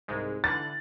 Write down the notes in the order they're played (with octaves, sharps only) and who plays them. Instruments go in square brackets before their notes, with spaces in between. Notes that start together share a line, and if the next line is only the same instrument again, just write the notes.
[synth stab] C2 G#2 G#3
[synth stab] D3 E3 F#6 [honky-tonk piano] A6